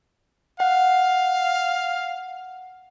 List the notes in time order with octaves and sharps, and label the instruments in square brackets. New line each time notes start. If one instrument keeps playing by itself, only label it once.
[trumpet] F5 [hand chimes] F#5